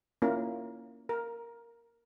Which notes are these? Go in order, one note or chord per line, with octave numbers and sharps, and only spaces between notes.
A#3 C#4 E4 F4 A#4
A#4